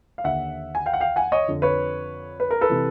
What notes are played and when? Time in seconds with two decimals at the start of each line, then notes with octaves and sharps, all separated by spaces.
0.18 F5
0.24 D#2 D3 E5 F#5
0.75 G#5
0.86 F5 G5
0.94 F#5
1.01 F5 G5
1.16 F#5 G#5
1.32 C#5 D#5
1.48 F2 D3
1.62 B4 C#5
2.40 B4
2.51 A#4
2.61 A4 B4
2.70 C3 E3